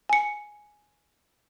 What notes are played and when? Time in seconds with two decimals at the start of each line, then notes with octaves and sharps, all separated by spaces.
0.09 G#5 C#7